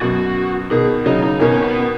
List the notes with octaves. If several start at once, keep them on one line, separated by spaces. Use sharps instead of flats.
F#2 B2 F#4
B2 D#3 G#4
C#3 F#3 D#4
D#4
B2 D#3 C#4
B3